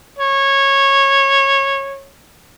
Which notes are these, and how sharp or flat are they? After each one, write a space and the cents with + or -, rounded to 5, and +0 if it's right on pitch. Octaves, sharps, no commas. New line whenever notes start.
C#5 -15